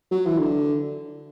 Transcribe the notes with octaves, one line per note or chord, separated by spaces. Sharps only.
F#3
E3
D3